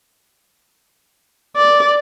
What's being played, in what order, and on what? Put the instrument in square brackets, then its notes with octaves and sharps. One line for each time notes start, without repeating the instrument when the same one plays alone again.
[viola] D5